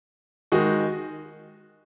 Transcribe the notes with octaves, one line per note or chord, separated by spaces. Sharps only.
D#3 G#3 D#4 F#4